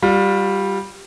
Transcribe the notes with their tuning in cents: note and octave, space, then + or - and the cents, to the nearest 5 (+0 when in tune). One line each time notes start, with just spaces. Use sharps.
G3 +0 F4 +30